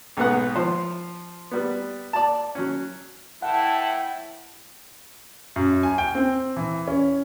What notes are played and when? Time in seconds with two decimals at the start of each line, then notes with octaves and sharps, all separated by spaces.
0.17 B1 G#2 B3 F#5
0.56 F3 C5
1.51 G3 B3
2.13 D5 A5
2.55 F#3 C#4
3.42 A2 E3 E4 F#5 G5 A5
5.56 F#2
5.83 G#5
5.98 G5
6.15 C4
6.57 E3
6.88 C#4